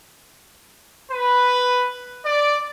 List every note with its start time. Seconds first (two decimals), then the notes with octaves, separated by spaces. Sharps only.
1.11 B4
2.25 D5